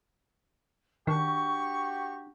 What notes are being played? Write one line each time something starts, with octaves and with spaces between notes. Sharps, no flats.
D#3 D4 F#4 G4 C#6